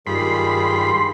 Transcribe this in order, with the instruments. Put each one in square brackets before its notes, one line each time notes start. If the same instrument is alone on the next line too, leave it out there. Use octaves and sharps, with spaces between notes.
[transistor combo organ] G2 B5 [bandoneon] D#3 F4 G#4 [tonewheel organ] C6